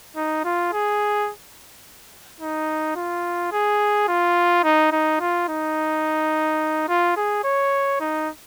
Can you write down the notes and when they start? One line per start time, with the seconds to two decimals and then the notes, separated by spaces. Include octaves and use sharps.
0.16 D#4
0.45 F4
0.73 G#4
2.40 D#4
2.96 F4
3.52 G#4
4.08 F4
4.64 D#4
4.92 D#4
5.20 F4
5.48 D#4
6.88 F4
7.16 G#4
7.44 C#5
8.00 D#4